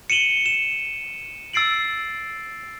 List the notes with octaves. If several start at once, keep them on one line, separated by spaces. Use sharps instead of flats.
C#7 D#7 E7 F#7 G7
E7
E6 A6 C7 D7 F#7